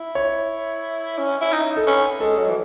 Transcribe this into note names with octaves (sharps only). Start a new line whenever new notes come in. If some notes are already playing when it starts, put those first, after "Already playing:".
Already playing: E4
C#5
C#4
E4
D#4
A4
C#4 B4
G#3 A4
F#3
E3